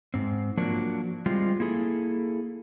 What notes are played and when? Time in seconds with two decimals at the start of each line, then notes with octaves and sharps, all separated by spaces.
0.14 G#2 C4
0.57 F3 F#3 A#3 D4 F#4 A#4
1.26 G3 G#3 C4 F4
1.60 A#3 E4 G#4 A4